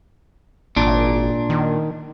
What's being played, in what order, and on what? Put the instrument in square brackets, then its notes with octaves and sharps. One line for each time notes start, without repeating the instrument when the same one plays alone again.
[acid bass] G#1 [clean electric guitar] A#2 D4
[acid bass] D#3